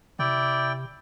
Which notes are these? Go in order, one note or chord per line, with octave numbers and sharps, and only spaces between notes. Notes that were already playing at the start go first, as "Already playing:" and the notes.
C3 E4 D5 G5